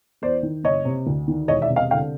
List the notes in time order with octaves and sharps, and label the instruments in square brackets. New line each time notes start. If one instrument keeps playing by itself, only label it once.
[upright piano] E2 C5 D5
D#3
F#1 C#5 D#5
C3
D2
D#3
E1 C#5 D#5
D5 E5
C3
D#5 F5
D3 F5 G5